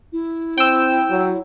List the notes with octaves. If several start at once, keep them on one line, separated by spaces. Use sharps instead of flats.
E4
C4 G5 E6
F#3